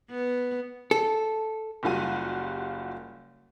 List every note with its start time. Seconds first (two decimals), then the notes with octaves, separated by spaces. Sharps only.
0.10 B3
0.91 A4
1.83 F#1 G3 F4 F#4 D#7